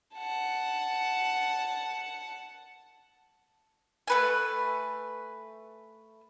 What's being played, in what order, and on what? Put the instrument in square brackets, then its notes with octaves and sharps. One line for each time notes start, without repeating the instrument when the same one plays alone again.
[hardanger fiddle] F#5 A5
[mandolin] A3 B4 G#5